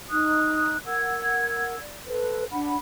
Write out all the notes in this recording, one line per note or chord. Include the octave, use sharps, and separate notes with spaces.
D#4 D#6 F#6
A#4 F#5 E6 G#6
D5
A4 B4 C5
D4 F#5 B5